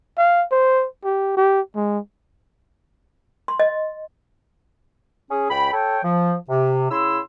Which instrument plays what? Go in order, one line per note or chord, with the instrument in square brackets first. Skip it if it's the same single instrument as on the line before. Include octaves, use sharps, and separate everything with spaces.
[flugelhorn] F5
C5
G4
G4
G#3
[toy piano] C6
D#5
[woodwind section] C#4 G#4
C#2 G5 B5
A4 C#5 G5
F3
C3
C#3 E4 C6 E6